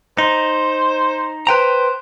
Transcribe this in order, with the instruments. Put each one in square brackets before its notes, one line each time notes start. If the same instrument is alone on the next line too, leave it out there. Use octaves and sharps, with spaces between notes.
[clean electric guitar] D#4 [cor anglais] C5
[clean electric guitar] B4 G5 A#5 [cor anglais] C5